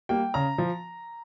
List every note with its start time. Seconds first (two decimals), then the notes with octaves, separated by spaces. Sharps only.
0.09 G3 A#3 G5
0.34 C#3 A#5
0.58 F3